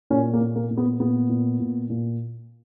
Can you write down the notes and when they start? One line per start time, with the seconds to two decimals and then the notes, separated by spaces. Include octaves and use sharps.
0.10 A#2 C#4
0.33 A#3
0.41 A#2
0.56 A#3
0.71 A#2
0.77 B3
1.00 A#2 B3
1.29 A#2
1.60 A#2
1.90 A#2